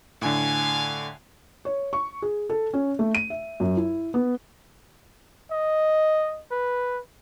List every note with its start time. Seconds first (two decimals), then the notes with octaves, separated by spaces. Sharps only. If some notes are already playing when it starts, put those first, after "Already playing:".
0.22 A2 D3 F5 G#5
1.65 C#5
1.93 C#6
2.22 G#4
2.50 A4
2.73 C#4
2.99 A3
3.15 D#7
3.30 E5
3.60 F#2
3.77 E4
4.14 B3
5.51 D#5
6.52 B4